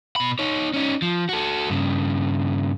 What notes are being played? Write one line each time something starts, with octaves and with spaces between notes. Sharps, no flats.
B2 B5
D#4 C#5
C#4 D#4
F3
F#4 A4
G2 C#3